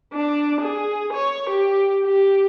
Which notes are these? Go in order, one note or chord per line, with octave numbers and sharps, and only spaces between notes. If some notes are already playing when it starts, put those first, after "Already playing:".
D4
G#4
C#5
G4
G4